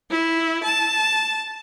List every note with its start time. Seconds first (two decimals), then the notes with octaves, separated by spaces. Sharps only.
0.10 E4
0.64 A5